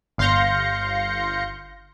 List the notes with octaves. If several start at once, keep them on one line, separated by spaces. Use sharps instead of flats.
G1 F5 C6 G6 A#6 C#7